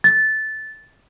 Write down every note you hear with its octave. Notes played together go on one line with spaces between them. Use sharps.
A6